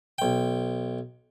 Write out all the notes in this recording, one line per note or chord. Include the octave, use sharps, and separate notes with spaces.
B1 G5